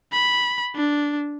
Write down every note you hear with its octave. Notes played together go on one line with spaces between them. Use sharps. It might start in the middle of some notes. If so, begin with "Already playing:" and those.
B5
D4